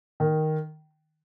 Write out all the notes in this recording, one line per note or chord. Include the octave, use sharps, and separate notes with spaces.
D#3